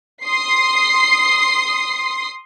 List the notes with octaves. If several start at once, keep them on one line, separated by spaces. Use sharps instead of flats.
C6 D#6 C7